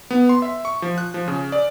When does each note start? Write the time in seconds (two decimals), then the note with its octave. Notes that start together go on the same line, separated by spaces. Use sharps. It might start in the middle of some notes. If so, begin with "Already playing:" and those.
0.10 B3
0.29 C6
0.42 E5
0.65 C#6
0.82 F3
0.98 F#6
1.14 F3
1.28 C#3
1.52 D5